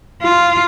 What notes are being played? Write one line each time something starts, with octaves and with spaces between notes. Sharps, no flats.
F4